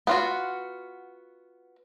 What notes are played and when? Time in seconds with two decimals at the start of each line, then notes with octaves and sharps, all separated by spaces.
0.07 B3 F4 F#4